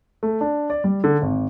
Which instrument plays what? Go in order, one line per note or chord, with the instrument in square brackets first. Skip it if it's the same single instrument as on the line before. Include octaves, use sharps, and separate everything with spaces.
[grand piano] A3
D4
D5
G3
D3
G#1